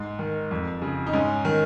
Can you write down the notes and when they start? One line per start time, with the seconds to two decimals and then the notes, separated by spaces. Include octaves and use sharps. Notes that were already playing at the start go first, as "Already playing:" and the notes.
Already playing: G#2
0.19 D#3
0.51 F2
0.82 C#3
1.06 D#4
1.13 G#2 C#4
1.45 D#3